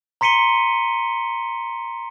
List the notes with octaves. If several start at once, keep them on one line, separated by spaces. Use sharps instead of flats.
A#5 C6 B6 C#7 D#7 G7